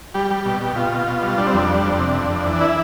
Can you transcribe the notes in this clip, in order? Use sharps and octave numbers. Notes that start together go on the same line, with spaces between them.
G3 G4
G3
B2
B2
B2 F4
B2
B2
G3
G3 D4
C4
F2 D4
G3
F2
C3
F2
F2
E3
E4